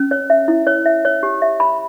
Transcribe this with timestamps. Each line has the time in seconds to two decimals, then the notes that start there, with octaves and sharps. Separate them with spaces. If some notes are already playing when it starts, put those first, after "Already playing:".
Already playing: C#4
0.11 C#5
0.30 E5
0.48 E4
0.67 C#5
0.86 E5
1.05 C#5
1.23 G4
1.42 E5
1.60 B5